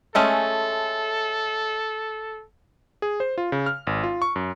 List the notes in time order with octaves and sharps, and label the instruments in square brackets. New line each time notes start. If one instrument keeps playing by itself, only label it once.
[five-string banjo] G#3 A3 C#4 [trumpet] A4
[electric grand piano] G#4
C5
F4
C#3
F6
G#1
F4
C#6
F#2